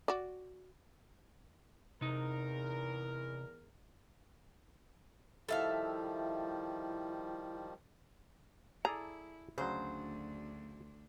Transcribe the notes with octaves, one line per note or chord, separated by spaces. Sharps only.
F#4 D5
E2 C3 D#4 A#4
D#3 F3 G3 E4 A4 E5 F5
E4 G#4 A4 D5 A#5
D2 C#3 F#3 D4 C5